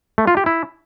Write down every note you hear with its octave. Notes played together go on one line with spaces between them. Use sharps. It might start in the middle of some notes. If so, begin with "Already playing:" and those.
A3
F4
G4
E4